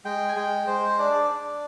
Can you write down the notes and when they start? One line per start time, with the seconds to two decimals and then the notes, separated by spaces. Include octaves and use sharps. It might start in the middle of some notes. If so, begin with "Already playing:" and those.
0.05 G#3 G5
0.29 G#5
0.36 G#3 G5
0.67 G#3 C5
0.99 D4 D5
1.30 D4